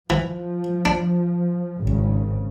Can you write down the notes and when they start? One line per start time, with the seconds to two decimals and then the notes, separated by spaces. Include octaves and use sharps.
0.10 E3 F3
0.85 D4
1.83 G#1 C#3